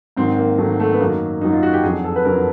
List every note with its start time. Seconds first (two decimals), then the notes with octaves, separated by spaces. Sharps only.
0.17 G#2 D#3 F#3 C4
0.38 A#3
0.58 G#2 D#3 F#3 A3
0.80 A3
0.93 B3
1.00 F#2 D#3 F#3 A#3
1.41 F#2 D#3 F#3 D#4
1.53 F4
1.63 F#4
1.73 G4
1.83 F2 D3 F#3 G#4
2.04 A4
2.16 B4
2.25 F2 D3 F#3 A#4